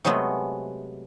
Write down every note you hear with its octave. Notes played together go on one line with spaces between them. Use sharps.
C3 F#3 G#3 A3 B3